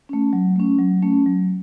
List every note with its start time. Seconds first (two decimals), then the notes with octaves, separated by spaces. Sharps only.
0.09 A3 C#4
0.33 F#3
0.56 A3 C#4
0.79 F#3
1.03 A3 C#4
1.26 F#3